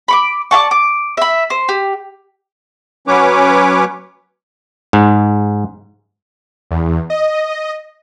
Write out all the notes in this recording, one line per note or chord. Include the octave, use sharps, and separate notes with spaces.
B5 C#6 D6
D5 F5 A5 C#6
D6
E5 B5
C5
G4
F#3 C#4 B4 C#5 D6
G#2
E2
D#5